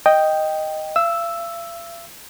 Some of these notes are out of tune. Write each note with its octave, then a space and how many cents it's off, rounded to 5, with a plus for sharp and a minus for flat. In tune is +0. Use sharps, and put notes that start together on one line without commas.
D#5 +0 G5 +0
F5 -45 E6 +0